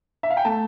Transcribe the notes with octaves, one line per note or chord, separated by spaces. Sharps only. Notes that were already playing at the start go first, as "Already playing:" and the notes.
E5
F5
G5
A3 A5